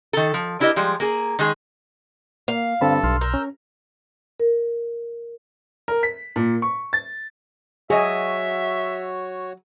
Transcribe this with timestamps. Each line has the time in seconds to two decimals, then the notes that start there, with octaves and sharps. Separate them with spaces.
0.13 D#3 A4
0.34 F3
0.60 D4 E4 G4 A#4 D#5
0.76 F3 G3 G#3
1.00 A#3 G#4
1.39 D#3 G#3 G#4
2.48 A#3 F5
2.81 G2 D3 C4 A4 A5 B5
3.04 B1 C6 F6
3.21 A#4 E6 G6
3.34 C#4
4.40 A#4
5.88 A#4
6.03 B6
6.36 A#2
6.62 C#6
6.93 A6
7.90 F#3 F#4 G#4 C#5 D#5 E5 G#5